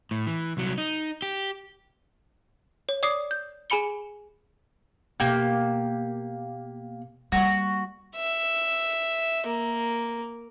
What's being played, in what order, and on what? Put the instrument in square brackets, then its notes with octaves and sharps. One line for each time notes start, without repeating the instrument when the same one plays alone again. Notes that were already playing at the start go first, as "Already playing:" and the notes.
[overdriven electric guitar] A2
E3
C2 F#3
D#4
G4
[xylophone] C#5
D5 D6 D#6 C7
G6
G#4 G#5 B5 C#7 G7
[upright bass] B2 [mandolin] A#3 G4
[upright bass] G3 A#3 [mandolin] F#4
[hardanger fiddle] E5
A#3